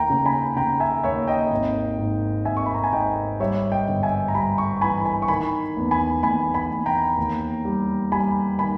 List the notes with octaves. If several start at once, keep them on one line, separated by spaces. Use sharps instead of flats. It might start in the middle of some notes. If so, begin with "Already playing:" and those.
Already playing: D#2 E5 G5 A#5
C#3
G#5 B5
C#3 G5 A#5
E5 G#5
D#2 C#5 E5
D#5 G5
G#1
G#2
G#1 E5 G#5
C#6
B5
A#5
G#5
G#2 D#5 G5
G3 C#5 E5
D#5 G5
G1
E5 G#5
A#5
G3 G#5 B5
A#5 C#6
E3 G#5 B5
G#5 B5
C#6
D#3 G#5 B5
E2
G#5 B5
E2 G#5 B5
G#5 B5
E2
G5 A#5
D#2
G3
G3 G#5 B5
D#3 G#5 B5